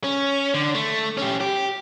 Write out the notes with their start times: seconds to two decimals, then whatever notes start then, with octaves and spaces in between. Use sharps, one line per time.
0.04 C#4
0.54 D3
0.75 A3
1.17 C#4 G4
1.41 G4